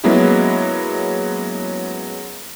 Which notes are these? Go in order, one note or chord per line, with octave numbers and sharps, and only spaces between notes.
F#3 G#3 A#3 B3 C#4 E4